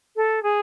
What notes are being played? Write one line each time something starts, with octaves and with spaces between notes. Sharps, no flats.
A4
G#4